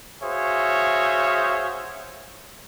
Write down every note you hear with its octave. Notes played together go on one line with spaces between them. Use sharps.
F#4 G#4 C5 C#5 E5 F5